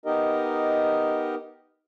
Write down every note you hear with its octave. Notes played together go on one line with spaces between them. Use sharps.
B3 D#4 G4 A#4 D#5